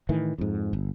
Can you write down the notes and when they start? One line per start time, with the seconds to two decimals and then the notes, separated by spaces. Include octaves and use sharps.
0.09 A2 D#3 E3
0.38 F2 G#2
0.73 G1